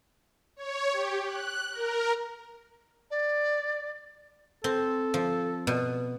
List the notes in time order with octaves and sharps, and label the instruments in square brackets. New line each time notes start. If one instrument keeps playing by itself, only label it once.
[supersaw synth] C#5
G4
F#6
A#4
[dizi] D5
[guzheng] C4 [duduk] A4
[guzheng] F3
B2